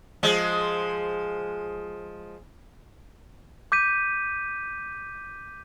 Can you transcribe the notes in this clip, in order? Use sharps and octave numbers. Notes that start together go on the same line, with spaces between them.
F3 G#3
D6 G6 B6 D#7